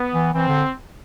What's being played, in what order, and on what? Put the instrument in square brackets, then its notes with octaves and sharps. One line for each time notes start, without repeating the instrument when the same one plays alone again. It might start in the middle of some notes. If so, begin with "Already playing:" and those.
Already playing: [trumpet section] B3
[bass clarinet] E3
[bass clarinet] E3 [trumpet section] C4
[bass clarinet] D3